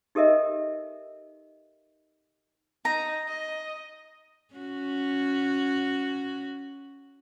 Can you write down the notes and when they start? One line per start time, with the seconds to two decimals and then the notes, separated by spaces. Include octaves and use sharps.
0.15 D#4 G4 A4 A#4 D#5 E5
2.85 D#4 A#5
3.27 D#5
4.55 C#4 F#4